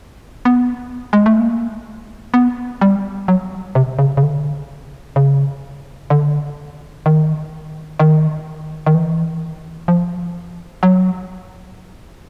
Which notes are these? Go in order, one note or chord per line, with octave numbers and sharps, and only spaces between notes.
B3
G#3
A3
A#3
B3
G3
F#3
C3
C#3
C#3
D3
C#3
D3
D#3
D#3
D#3
E3
F3
F#3